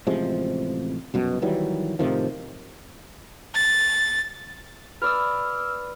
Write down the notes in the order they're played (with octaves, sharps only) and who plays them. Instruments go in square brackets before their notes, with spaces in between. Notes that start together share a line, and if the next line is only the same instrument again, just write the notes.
[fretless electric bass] A1 C3 F3 G#3
C2 F#2 B2
D#3 E3 F#3 G3
A2 C3 D#3 F3
[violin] A6
[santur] B4 D5 [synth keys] E6 F6